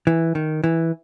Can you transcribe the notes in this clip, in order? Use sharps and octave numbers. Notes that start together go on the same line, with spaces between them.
E3
D#3
E3